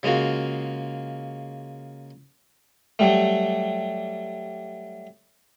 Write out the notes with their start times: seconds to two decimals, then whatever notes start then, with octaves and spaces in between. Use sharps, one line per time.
0.03 C#3 G#3 A#3 F4 F#4
2.99 F#3 G3 A3